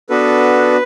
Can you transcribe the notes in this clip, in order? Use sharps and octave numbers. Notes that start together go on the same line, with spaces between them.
B3 D4 F#4 A4 B4